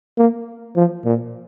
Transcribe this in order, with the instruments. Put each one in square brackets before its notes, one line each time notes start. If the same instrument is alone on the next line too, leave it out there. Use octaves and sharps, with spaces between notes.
[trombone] A#3
F3
A#2